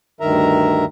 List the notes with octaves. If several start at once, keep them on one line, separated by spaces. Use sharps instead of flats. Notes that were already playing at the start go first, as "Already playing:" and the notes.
D2 G2 D#3 A#4 E5 A#5